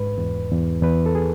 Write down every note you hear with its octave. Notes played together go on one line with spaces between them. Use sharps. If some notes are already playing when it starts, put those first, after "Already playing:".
Already playing: G#2 B4
E2
E2
E2 B4
A4
G#4